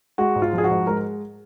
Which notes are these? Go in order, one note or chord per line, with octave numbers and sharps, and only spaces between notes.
G#3 F#4
G#2
F4
F3 G#4
F#4
G#2
G#3 A#4